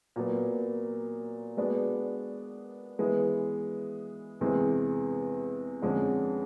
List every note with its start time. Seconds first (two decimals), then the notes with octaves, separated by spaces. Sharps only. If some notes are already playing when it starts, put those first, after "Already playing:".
0.16 A#2 F#3 B3
1.57 G#3 B3 D4 F#4
2.99 E3 G#3 B3
4.41 E2 C3 E3 G#3 C4
5.82 F2 D3 F3 G#3 C#4